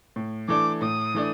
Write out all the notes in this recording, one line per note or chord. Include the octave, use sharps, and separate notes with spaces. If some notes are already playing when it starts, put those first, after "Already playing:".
A2
E3 A3 D4 D6
A2 D#6
E3 A3 D4